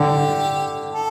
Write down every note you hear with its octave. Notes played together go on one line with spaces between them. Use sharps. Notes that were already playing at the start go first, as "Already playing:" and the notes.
Already playing: D3 G4
A4